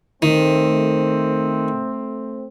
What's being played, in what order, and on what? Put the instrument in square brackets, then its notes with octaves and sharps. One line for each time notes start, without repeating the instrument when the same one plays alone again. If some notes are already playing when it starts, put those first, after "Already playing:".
[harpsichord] D#3 [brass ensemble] A3 C4